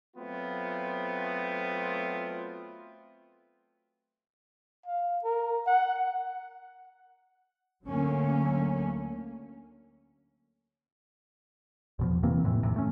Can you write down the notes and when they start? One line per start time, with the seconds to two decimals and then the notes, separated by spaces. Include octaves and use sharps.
0.15 F#3 A3 B3 C4 F4
4.86 F5
5.24 A#4
5.67 F#5
7.86 D2 D3 F#3 A3 A#3 C#4
11.99 E2 B2 F3
12.23 C3 E3 A#3 C4
12.44 F2 A2 C3 E3
12.63 B1 F2 A2 C3
12.76 A3 C#4